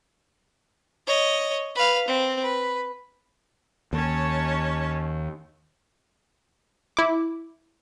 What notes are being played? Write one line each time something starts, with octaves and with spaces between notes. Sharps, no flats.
C#5 D#5
B4 F5
C4
B4
D#2 C#4 C#5 A5
E4 D6